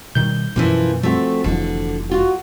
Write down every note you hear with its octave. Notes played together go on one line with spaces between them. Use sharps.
B2 D#3 G3 G6
F#2 B2 E3 F3 A#3
F3 A3 C4 F#4
F1 F2 D3 E3
F4 F#4